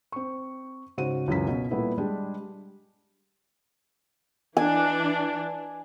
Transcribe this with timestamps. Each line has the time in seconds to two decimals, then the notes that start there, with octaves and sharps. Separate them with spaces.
0.12 C4 C#6
0.97 G#2 C#3 F#4 C5 D#7
1.27 C#2 F#2 E3 C#4 B6
1.47 B2 C#4
1.71 A#2 G3 A3 B3 E4
1.98 G3 G#3 D4 G4 G#4
4.57 E3 D4 G#5